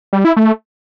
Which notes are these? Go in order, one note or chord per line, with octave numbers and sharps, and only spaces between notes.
G3
E4
A3